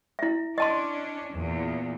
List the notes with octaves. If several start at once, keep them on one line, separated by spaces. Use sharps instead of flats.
E4 E5
C#4 D4 D#5 A5 C6
E2 A#2